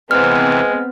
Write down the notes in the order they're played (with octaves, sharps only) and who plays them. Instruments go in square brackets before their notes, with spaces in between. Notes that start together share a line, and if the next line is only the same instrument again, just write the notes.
[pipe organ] C3 E3 [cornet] G#3 [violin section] B3 C4 [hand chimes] F6